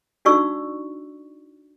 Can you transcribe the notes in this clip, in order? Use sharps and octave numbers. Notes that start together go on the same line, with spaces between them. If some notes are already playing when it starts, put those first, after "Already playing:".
D4 D#4 F#4 D5 C#6 E6